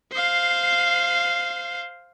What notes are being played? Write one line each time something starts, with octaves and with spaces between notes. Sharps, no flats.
C5 F5